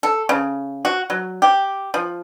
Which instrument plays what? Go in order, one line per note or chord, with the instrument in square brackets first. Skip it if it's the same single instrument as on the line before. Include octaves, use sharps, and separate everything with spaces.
[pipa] A4
C#3
F#4
F#3
G4
F3